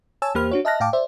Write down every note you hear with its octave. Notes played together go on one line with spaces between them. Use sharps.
C#5 G#5 A5 E6
E2 A#3 G4 C5 B5 F6
D4 F#4 C#5
D#5 E5 A5 F6 F#6 A#6
A2 F5 G5 A5 D6
C5 D5 E5